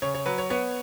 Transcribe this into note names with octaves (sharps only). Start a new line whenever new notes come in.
C#3 C#5
C#5
F#3 B4
C#5
B3 C#5